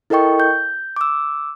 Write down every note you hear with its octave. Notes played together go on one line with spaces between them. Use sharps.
E4 A4 A#4 D#5 G5 C#6
G6
D6 E6